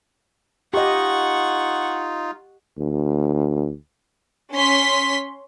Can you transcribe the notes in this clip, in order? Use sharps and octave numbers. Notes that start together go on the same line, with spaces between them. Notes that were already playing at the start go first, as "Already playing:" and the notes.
D#4 F4 G4 D#5 F#5 C#6
D2
C#4 C6 B6